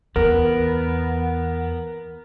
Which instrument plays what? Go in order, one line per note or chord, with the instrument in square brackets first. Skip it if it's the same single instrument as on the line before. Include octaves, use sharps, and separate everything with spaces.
[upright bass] E2 [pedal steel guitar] B3 [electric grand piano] A#4